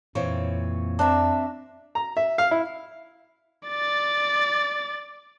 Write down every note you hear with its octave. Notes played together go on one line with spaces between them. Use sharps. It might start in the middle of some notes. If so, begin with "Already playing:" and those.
F2 A#2 E3 C4 C#5
C4 D4 E5 A#5
A#5
E5
F5
E4
D5 A6